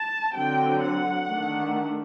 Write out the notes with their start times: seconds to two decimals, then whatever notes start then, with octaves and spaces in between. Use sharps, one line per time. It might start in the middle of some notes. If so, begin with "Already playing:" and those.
Already playing: A5
0.35 D3 F#3 C4 G5
0.83 F#5
1.30 D#3 A3 D4